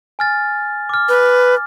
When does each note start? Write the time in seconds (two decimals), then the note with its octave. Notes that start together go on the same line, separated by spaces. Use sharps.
0.19 G#5 F6 A6
0.89 D6 F6
1.09 B4